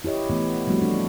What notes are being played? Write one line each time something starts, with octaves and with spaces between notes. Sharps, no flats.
E4 G4 C#5 D#5
E3 A3 B3
F3 G3 A3 C4 F#4
D4